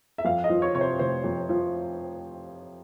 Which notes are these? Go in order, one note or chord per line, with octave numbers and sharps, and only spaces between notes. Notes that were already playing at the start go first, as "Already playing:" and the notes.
E5
F2 F5
D#5
F3
C#5
C3 C#5
C5
F1 C5
F2
F3